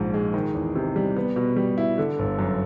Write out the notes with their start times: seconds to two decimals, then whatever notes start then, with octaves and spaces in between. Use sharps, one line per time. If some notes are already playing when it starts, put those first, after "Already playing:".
Already playing: A#1 G#2 F3
0.14 G#3
0.34 D#3
0.55 E2
0.75 C3
0.96 G3
1.16 B3
1.36 B2
1.56 G3
1.78 E4
1.98 D3
2.19 G1
2.39 F#2